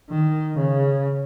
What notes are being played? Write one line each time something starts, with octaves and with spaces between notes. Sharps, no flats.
D#3
C#3